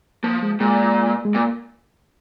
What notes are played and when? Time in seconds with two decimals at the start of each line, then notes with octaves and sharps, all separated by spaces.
0.24 F3 A#3
0.43 G#3
0.60 A#2 G#3
1.25 G#3
1.35 A#2 A#3